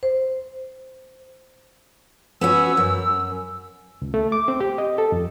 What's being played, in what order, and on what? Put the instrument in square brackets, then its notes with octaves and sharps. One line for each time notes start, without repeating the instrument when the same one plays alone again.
[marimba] C5
[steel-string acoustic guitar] B3 C#4 F#4 [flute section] E6
[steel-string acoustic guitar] F#2
[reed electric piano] C#2
A3
D6
C4
G4
D#5
A4
F2